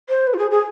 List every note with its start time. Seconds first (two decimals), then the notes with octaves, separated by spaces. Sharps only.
0.09 C5
0.27 B4
0.34 F4
0.39 G#4
0.51 G#4